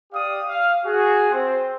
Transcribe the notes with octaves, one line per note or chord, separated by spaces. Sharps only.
G4 D5 F5 D#6
F5
F#4 G#4
C4 C5